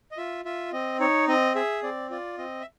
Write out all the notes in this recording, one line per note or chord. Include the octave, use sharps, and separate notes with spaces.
D#5
F4 E5
F4 E5
C4 D#5
D#4 C#5
C4 D#5
G#4 E5
C4 D5
F4 D5
C4 D#5
E5